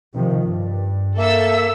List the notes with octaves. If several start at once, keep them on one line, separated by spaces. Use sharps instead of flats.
C3 D#3 F3
G2
A#3 A4 E5 E6